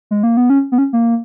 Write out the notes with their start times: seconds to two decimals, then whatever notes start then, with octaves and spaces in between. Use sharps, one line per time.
0.11 G#3
0.23 A#3
0.37 B3
0.50 C#4
0.72 B3
0.78 C#4
0.93 A#3